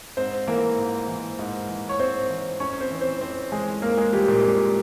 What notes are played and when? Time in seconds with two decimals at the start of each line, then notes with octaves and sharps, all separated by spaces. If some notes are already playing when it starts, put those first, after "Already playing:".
0.17 G#2 C4 C5
0.47 E3 A#3 A#4
0.78 G#2
1.08 E3
1.39 G#2
1.69 E3
1.89 C#5
2.00 G#2 C4 C5
2.30 E3
2.60 F2 C#4 C#5
2.81 C4 C5
2.91 E3
3.01 C4 C5
3.21 F2 C4 C5
3.52 E3 G#3 G#4
3.82 F2 A#3 A#4
3.97 G#3 G#4
4.13 E3 G3 G4
4.28 A#2 A#3
4.43 F2 G#3